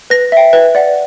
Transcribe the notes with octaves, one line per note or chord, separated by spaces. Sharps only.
B4 A#6
E5 G5
B4
D5 F#5